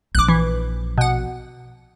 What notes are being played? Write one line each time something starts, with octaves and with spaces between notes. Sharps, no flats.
A#1 F3 D6 F#6
E3
B2 F#5